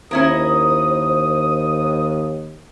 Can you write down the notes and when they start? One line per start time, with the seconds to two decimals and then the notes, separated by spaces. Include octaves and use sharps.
0.11 D#2 C#4 E4 A#4 C5 D#6